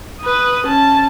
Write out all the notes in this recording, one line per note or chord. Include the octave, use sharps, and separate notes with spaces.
B4 D#6
C#4 A5